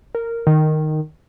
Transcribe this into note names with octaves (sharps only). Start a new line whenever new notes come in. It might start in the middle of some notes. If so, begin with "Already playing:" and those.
A#4
D#3